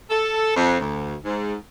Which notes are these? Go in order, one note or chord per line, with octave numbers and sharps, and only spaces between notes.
A4
F2
D2
G#2